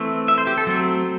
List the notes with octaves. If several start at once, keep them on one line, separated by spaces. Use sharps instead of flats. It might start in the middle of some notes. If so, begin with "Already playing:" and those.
Already playing: E3 A3 C4
E5
C5
G4
A4
F#3 A3 C4